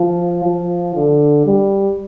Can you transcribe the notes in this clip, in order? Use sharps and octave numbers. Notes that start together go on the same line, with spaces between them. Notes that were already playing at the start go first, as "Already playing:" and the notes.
Already playing: F3
F3
D3
G3